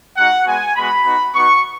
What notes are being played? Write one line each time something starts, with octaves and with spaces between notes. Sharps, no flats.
G#3 D#4 F#4 F#5
G#3 B3 F#4 G#5
G#3 B3 F#4 B5
B3 D#4 F#4
B3 D#4 F#4 C#6